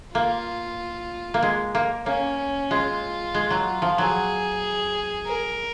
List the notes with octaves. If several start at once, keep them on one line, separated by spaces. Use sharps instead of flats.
A#3 F4
A#3
G#3
A#3
A#3 C#4
G#3 F4
G#3
F#3
F3
F#3 G#4
A#4